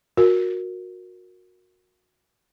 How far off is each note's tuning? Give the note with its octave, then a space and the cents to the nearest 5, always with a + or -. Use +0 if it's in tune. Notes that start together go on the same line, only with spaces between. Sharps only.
F#4 -25 A#4 +0